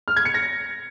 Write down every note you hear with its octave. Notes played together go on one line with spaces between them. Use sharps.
F6
G#6
C#7
A#6